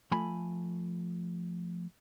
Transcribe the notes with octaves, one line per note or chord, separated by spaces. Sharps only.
F3 A3 G#5 B5